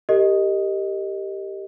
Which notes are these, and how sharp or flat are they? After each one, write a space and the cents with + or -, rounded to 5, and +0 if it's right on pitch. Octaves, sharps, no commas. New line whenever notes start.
G4 +0 A#4 -40 D#5 +0